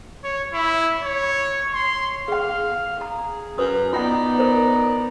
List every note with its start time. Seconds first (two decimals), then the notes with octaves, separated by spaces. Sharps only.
0.24 C#5
0.53 E4
1.03 C#5
1.74 C6
2.28 G#4 F5 F#5
3.01 G#4 A#5
3.58 F#2 B4 D#6
3.93 B3 D#4 F4 D5 F#5
4.39 A#4 C5